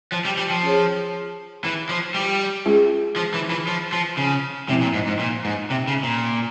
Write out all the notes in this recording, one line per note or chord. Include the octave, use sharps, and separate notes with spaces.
F3
G3
G3
F3
C#4 F4 G#4 C#5
E3
F3
G3
G#3 C#4 F4 G#4
F3
E3
E3
F3
F3
C#3
C3 F3 G#3 C4 E4
A#2
G#2
G#2
A#2
G#2
C3
C#3
A#2